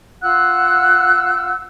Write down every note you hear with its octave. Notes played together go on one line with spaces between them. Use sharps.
F4 F#5 E6 F#6